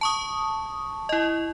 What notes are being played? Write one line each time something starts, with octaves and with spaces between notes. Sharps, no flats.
A5 C#6 D#6
E4 D#5